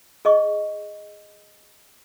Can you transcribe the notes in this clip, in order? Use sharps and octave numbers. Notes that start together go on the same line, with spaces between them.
G#4 D#5 C#6